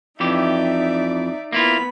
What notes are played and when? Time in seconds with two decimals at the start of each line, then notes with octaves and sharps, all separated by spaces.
0.20 F2 E3 D#4 G4 D5 E5
1.53 A#3 B3 E4 F4 B5